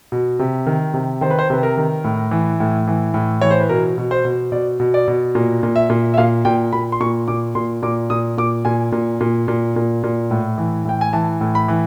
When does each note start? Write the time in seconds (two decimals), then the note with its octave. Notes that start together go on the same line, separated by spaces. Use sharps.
0.12 B2
0.39 C3
0.67 D#3
0.94 C3
1.21 D#3 C5
1.30 B4
1.39 C5
1.50 C3 B4
1.63 A#4
1.77 D#3
2.04 A2
2.31 E3
2.60 A2
2.87 E3
3.14 A2
3.41 E3 C#5
3.50 C5
3.60 B4
3.69 B2 A#4
3.98 B2
4.11 C5
4.25 B2
4.52 B2 D5
4.80 B2
4.94 D5
5.08 B2
5.35 A#2
5.63 A#2
5.76 E5
5.90 A#2
6.14 E5
6.17 A#2 F5
6.45 A#2 G5
6.73 A#2 B5
6.92 C6
7.00 A#2 C#6
7.28 A#2 D6
7.55 A#2 C6
7.82 A#2 D6
8.10 A#2 D#6
8.38 A#2 D6
8.65 A#2 G#5
8.92 A#2
9.21 A#2
9.48 A#2
9.76 A#2
10.03 A#2
10.31 A2
10.58 E3
10.85 A2 G5
11.01 G#5
11.13 E3 A5
11.41 A2
11.55 B5
11.68 E3